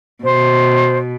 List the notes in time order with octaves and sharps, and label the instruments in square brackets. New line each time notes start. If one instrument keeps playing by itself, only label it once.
[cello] B2 [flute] C5